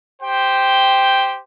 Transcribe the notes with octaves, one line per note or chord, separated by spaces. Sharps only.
G4 C5 G5